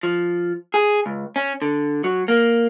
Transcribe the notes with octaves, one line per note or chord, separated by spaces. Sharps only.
F3
G#4
C#2
C#4
D3
F#3
A#3